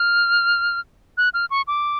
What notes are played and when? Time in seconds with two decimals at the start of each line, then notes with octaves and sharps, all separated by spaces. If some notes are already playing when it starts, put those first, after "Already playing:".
Already playing: F6
1.18 F#6
1.34 F6
1.50 C#6
1.68 D6